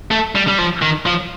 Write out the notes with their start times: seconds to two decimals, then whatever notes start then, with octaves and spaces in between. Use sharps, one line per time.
0.11 A3
0.35 G3
0.48 G3
0.58 F3
0.82 D#3
1.06 F3